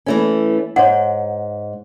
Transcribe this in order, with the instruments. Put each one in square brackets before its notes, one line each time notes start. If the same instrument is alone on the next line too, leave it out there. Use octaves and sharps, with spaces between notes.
[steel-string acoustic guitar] E3 A3 C#4
[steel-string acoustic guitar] G#2 [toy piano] C#5 F#5